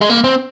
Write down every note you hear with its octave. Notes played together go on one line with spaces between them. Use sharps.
G#3
A#3
C4